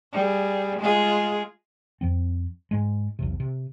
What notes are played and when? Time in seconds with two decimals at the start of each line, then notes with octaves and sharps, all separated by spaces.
0.13 G3 G#4
0.79 G#3 F4 G#4
2.01 F2 F3 C4
2.71 G#2 G#3
3.19 B1 E2 C3
3.40 C3